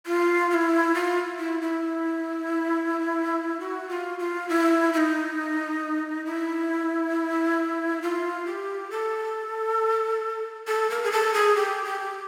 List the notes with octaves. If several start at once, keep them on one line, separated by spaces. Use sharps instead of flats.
F4
F4
E4
F4
E4
E4
F#4
F4
F4
E4
E4
D#4
E4
F4
G4
A4
A4
A#4
G#4
A4
G#4
G4
G4